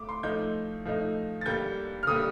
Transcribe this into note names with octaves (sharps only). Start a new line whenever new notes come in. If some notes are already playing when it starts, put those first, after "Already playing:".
Already playing: A3 D6
C6
F3 A3 D#4 G6
F3 A3 D#4
A6
D3 G3 A#3 G6
F6
D3 G3 A#3 D#6